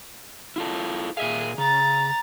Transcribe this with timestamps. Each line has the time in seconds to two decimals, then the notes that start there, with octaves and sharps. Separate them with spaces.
0.56 E4 F4 A4
1.17 A#2 G#4 E5 F5
1.58 C#3 A#5 A6